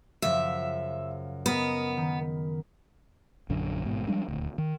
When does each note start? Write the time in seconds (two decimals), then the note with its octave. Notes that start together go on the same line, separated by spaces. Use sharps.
0.22 F#2 C#3 F3 E5
1.46 B3 A#4 D#5
1.97 D#3
3.49 A#1 F#2 D3
3.84 A1 G#2 B2
4.08 F3 G3 G#3 D4
4.28 D#1 D2
4.58 D#3